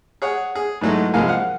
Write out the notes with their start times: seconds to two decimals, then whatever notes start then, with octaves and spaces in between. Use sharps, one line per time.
0.22 G#4 C#5 F#5
0.55 G#4
0.81 G#2 E3 F#3 G#3 A3
1.14 C2 F3 G#3 A#3 F5 G#5
1.28 F5 F#5